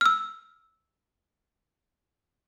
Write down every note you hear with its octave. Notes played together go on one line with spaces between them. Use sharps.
E6 F6